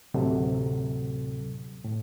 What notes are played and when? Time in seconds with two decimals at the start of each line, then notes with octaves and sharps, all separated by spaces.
0.14 D2 A2 C3 F#3 A4
1.85 A2